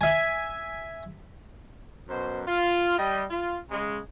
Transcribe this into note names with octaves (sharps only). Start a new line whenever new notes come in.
E5 G#5
F#2 B2 C5
F4
G3 D#5
F4
C#3 G#3